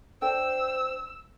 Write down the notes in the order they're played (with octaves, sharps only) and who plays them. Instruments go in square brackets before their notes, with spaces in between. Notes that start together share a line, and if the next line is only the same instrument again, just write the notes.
[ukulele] D4 A4 G5 [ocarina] C5 [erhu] E6